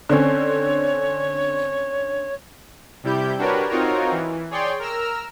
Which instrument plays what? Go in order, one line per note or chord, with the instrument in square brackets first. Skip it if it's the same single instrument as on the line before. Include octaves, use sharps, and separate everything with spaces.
[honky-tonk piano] D3 C4 C#4 [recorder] C#5
[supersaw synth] C3 G3 E4 G4 G6
D4 F#4 G4 A#4 B4 C#5
C4 D#4 F4 F#4 A#4 C#5
E3
G#4 C#5 D5 G5 C6
A#4 A#5 E6 F6